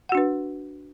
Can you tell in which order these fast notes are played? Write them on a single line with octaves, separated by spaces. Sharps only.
F#5 F#4 D4 B4